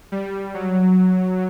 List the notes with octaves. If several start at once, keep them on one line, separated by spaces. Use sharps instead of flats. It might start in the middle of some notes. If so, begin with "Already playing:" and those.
G3
F#3